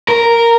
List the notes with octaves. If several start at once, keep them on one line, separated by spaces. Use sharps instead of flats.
A#4